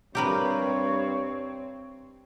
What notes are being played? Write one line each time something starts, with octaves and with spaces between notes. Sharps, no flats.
G2 C4 G4 A#4 B4 C#5